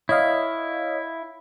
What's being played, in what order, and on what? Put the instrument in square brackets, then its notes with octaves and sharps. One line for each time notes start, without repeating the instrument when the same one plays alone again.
[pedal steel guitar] E4 [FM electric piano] C#5 D#5 F5